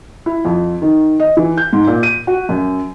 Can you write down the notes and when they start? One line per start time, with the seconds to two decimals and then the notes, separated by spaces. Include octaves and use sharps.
0.26 E4
0.45 F2
0.82 D#3
1.20 D#5
1.37 E3
1.57 G6
1.73 G#2
1.87 A#2
2.03 D#7
2.27 F#4
2.49 F#2